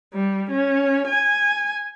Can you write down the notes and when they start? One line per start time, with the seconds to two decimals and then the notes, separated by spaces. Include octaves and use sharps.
0.13 G3
0.51 C#4
1.07 G#5